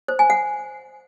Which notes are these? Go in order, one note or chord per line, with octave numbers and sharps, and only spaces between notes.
C5
G#5
F#5